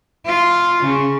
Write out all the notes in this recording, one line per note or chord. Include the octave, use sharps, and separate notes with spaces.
F4
C#3